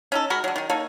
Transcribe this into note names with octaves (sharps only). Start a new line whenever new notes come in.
C#4 D#4 A4
G#3 F#4 A#4 B5
D3 F#3
D#3 D#4
A#3 D#4 A4 C#5